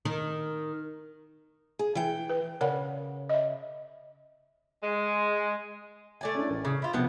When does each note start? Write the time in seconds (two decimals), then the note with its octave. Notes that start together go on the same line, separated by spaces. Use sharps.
0.05 D#3
1.79 G#4
1.95 E3 G5
2.30 B4
2.61 C#3 A#4 D5 F#5
3.29 D#5 E5
4.83 G#3
6.21 A3 D5 G#5
6.35 C#4 D4 E4
6.50 A1 C#4
6.65 C#3 D6 D#6
6.82 E4 F4
6.93 B1 C3 F3 B3 G6